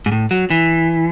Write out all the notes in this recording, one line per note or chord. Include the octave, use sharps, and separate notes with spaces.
G#2
A2
F#3
E3